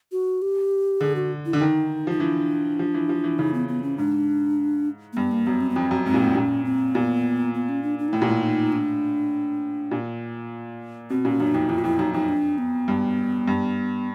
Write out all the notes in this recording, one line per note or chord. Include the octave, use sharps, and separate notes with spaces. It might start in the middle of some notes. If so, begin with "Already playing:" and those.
F#4
G4
D3 G#4
F#4
E4
D3 D4
D#3 D#4
F3 D#4
E3 D4
F3
E3
F3
E3
C#3 D#4
B3
B3
C#4
G#2 D4
A#3
G2 B3
A#3
F#2 B3
C4
B3
F2 C4
F#2
G#2 C4
A#2
A2
A#2 C#4
C4
A#2 B3
B3
C#4
D4
D4
D#4
A2 E4
A#2
A2
D#4
D4
A#2
B2 C4
A#2 C#4
F#2 D4
F2 D#4
F2 E4
F4
F2 E4
F#2 D#4
F2 D#4
D4
B3
G2
G2